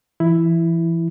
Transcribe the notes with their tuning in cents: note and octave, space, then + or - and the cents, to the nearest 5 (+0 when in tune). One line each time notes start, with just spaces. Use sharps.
E3 +30 E4 +0